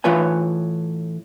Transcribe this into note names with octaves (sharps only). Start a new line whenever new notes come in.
A2 E3 F4 B4 C#5 G#5